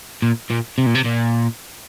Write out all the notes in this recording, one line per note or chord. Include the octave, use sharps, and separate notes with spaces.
A#2
A#2
C3
A#2
C3
A#2